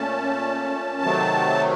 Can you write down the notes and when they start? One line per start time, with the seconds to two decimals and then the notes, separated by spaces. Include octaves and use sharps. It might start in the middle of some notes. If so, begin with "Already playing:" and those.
Already playing: A#2 A3 C#4 A5
1.03 C3 D#3 F#3 A3